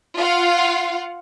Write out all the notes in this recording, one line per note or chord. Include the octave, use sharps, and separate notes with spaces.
F4 F5 F#5